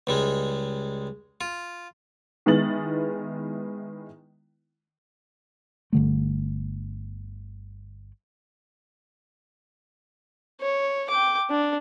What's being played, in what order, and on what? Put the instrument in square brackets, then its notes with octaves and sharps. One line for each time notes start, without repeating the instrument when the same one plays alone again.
[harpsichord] C#2 G3 G#3
F4
[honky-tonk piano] D#3 G#3 B3 E4 A6 F#7
[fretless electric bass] G1 D3 A3
[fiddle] C#5
G5 D6
D4